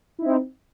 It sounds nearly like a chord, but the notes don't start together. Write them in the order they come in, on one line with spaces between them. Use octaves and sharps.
E4 D#4 C4